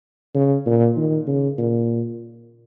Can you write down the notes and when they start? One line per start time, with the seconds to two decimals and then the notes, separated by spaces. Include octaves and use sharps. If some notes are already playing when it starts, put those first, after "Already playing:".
0.35 C#3
0.66 A#2
0.97 D#3
1.27 C#3
1.58 A#2